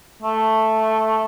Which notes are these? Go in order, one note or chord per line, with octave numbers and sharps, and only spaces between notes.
A3